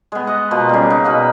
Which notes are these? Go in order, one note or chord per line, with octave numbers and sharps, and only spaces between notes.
G#3 B3
D#5 F#5
B2 F3 A#3 B4
C#3 G3
D#4
B2 B4 F5